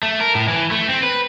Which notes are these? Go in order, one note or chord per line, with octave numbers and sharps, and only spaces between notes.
A3
A#4
A2
E3
A3
C4
B4